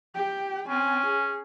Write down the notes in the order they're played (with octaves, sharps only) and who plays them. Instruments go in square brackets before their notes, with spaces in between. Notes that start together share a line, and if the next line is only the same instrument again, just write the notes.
[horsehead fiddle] G4 G5
[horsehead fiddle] C4 G#5 [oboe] C#4
[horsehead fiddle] G#4